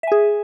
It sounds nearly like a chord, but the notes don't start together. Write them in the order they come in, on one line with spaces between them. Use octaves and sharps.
E5 G#5 G#4